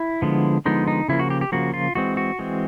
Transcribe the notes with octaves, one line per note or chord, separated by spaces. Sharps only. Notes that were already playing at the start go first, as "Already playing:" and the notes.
Already playing: E4
D3 F3 G#3 B3
D3 F3 G#3 B3 D#4
D#4
C#3 F3 A#3 E4
F#4
G4
G4
C#3 F3 A#3 F#4
F4
E3 G#3 C4 F#4
F#4
E3 G#3 C4